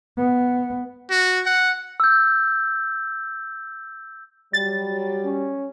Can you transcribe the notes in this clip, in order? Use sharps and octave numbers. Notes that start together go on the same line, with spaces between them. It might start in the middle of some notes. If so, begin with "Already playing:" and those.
B3
F#4
F#5
E6 G6
F#3 G3 A6
C#4